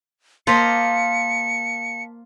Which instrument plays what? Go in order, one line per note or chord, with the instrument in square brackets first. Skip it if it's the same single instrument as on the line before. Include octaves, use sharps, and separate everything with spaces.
[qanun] A#3 [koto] F4 C5 D#5 [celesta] F5 A5 B6 [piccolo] C#7